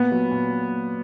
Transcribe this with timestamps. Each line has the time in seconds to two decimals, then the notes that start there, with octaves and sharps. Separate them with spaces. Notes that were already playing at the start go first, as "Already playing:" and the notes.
Already playing: A#2 B3
0.12 F#3
0.31 A#2